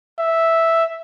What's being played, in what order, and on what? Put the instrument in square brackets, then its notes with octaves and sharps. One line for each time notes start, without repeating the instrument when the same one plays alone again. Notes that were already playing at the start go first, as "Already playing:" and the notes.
[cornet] E5